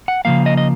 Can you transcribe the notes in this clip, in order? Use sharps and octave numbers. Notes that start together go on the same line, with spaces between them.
F#5
C#3 F3 A#3 F5
D#5
D#5